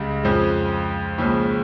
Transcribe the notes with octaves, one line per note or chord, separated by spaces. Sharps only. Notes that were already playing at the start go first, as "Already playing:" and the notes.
Already playing: C#2 C#3 G3
F2 C#3 F3 G#3
D#2 C#3 F3 G#3